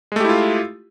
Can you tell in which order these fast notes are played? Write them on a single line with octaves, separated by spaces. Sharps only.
G#3 A3 G4 E4 F4